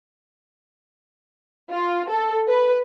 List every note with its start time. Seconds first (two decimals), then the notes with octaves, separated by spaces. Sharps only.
1.71 F4
2.09 A4
2.48 B4